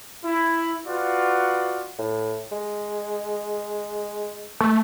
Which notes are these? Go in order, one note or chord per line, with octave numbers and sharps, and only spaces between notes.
E4
F4 F#4 B4 D5 F#5
A2
G#3
A3